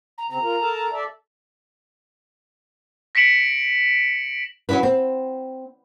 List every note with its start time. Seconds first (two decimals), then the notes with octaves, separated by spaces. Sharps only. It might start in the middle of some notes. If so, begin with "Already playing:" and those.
0.18 A#5
0.30 C#3 C4 A#5
0.42 F4 A#4
0.61 A4 A#4 A5
0.92 A4 D5 E5
3.15 A#6 B6 C#7 D7 E7 F#7
4.69 F#3 C#4 D4 E4 B4
4.83 C4